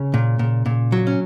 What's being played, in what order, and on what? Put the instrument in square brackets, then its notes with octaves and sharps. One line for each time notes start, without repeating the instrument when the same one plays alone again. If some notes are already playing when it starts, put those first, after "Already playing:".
Already playing: [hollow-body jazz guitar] C#3 C#4
A#2
A#2
A#2
F#3
C#4